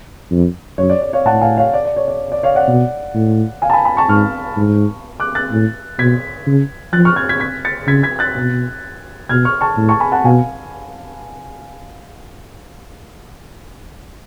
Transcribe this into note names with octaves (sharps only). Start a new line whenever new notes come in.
F2
F#2 C#5
D5
D5
C#5 F5
A2 F#5 A5
F5 G#5
C#5 F5
D5
D5
C#5
D5
D5
C#5 F5
D5 F#5
B2
A2
F5 G#5
A5
G#5 B5
G#5 B5
A5 C#6
G#2 C#6 F6
G#2
D6 F#6
F#6 A6
A2
B2 G#6 B6
C#3
F3 F#6 A6
C#6 F6
F6 G#6
G#6 B6
G#6 B6
A6 C#7
C#3 G#6 B6
G#6 B6
F#6 A6
B2
B2 F6 G#6
C#6 F6
A5 C#6
A2
A5 C#6
G#5 B5
F#5 A5
B2 F5 G#5